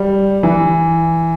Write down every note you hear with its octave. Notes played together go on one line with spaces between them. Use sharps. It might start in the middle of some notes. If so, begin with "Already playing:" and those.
Already playing: G3
E3